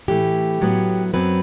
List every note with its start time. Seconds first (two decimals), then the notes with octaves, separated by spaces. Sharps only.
0.08 A2 E3 A3 G4
0.61 A2 F#3 B3
1.14 F#2 F#3 C4 B4